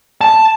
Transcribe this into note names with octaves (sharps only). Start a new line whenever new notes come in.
A5